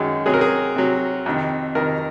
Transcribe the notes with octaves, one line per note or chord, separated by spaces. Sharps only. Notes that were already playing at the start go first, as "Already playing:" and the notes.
Already playing: F#2 D#3 G#3
C3 F#3 G#4
A#4
G#4
C3 F#3
F2 C3 D#3
F2 C3 D#3 A#4